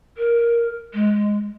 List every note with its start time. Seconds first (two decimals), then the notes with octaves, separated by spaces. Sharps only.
0.18 A#4
0.94 G#3